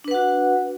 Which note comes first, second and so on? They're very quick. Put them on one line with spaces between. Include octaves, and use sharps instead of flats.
D4 B4 F#5 F#4